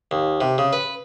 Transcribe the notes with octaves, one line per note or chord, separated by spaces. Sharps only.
D#2
C3
C#3
B4